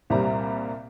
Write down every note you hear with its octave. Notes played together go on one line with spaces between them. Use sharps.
C2 A#2 G3 C4 A#5